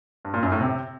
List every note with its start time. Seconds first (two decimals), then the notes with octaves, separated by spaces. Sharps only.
0.25 G2
0.34 A#2
0.43 F#2
0.52 A2
0.61 C3